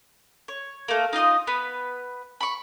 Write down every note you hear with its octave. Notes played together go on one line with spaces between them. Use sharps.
C#5
A3 A#3
D#4 F4 D#5 D#6
B3 B4
B5 C#6